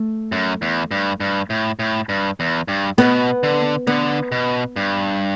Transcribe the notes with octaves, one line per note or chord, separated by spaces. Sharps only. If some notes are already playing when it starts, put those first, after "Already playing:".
Already playing: A3
F#2
E2
G2
G2
A2
A2
G2
E2
G2
B2 B3
D3
D3 B3
B2
G2